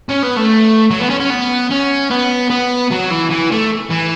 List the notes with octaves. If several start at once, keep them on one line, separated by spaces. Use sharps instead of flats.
C#4
B3
A3
F#3
B3
C#4
C#4
B3
C#4
B3
B3
F#3
E3
E3
A3
E3